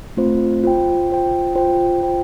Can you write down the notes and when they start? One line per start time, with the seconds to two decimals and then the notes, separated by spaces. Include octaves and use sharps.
0.17 A3 C4 F4 C5
0.64 F4 C5 G5
1.10 F4 C5 G5
1.55 F4 C5 G5
2.01 F4 C5 G5